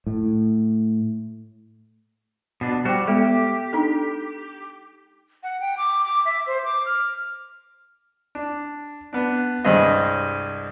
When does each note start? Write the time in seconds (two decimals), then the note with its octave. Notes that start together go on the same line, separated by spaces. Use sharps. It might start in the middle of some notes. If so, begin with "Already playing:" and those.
0.07 A2
2.61 B2 D4
2.85 G3 F#4 C5 G5
3.07 G#3 B3 G4 A4
3.73 D4 D#4 A4
5.43 F#5
5.60 G5
5.78 D6
6.04 D6
6.25 E5
6.47 C5
6.65 D6
6.86 F6
8.35 D4
9.13 B3 D4
9.65 C2 G2 G#3 C5 D#5